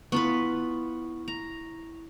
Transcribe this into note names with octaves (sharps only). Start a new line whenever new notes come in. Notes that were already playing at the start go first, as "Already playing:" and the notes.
B3 E4 F4 B4 C#6
A#5